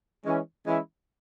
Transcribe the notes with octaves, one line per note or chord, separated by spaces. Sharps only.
E3 G#3 C#4
E3 G#3 C#4 E4